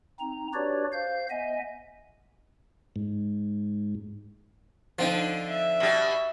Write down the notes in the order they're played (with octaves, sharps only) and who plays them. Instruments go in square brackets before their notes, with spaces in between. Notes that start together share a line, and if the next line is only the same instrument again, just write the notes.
[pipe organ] C4 D#4 A#5
D4 F#4 G4 B4 C#5 D5
C5 F5 G6
B3 D#5 E5 G#5
[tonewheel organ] G#2
[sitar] D3 [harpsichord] F3 C4 D#4
[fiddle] E5
[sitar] B2 G3